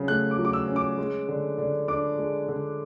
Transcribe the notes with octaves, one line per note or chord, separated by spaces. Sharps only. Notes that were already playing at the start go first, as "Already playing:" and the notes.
Already playing: C#3 F#3 C#4
A3 F#6
D6
F#3
D6
E6
C#4
D6
G#3
D3
D3
D4 D6
G#3
D3